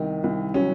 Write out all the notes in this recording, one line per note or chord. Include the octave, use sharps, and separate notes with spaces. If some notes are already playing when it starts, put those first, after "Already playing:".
Already playing: C2 D#3 D#4
C2
F#3 C#4